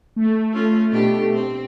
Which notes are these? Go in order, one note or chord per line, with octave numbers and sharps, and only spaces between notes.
A3
C#4 F4
B2 D4 G4
C4